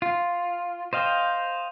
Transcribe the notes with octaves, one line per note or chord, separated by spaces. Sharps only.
F4
C5 D#5 F5 G5